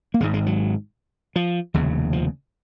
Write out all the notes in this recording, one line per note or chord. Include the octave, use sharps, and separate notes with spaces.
A#3
G#1 G#2 G#3
G#3
F#3
F3
F1 D#2 C#3
F3